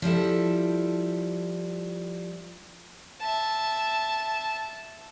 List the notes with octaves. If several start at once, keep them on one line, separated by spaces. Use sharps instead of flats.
F3 G3 E4 A4
E5 A5